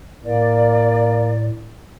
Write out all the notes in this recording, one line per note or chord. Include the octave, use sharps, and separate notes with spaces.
A2 A#3 D5